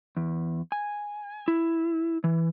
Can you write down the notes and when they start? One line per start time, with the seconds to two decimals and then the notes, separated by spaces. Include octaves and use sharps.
0.17 E2
0.72 G#5
1.48 E4
2.24 E3